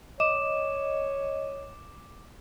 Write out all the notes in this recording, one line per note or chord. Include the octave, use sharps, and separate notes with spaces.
C#5 D#5 D6 E7